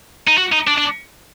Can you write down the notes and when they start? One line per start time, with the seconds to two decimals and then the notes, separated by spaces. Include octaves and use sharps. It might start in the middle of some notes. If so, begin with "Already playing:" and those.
0.27 D#4
0.37 F#4
0.52 D#4
0.67 D4
0.78 D4